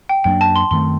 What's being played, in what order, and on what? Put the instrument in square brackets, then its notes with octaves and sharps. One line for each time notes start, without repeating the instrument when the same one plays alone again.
[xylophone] G5
[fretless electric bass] F#2 F#3 A#3 D4 [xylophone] G5
[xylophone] A5
C6
[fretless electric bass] F#2 D#3 A3 C4 [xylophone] C6